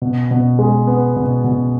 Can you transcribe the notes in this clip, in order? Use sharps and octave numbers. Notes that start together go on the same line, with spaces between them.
B2
B2
G#3
B3
B2
B2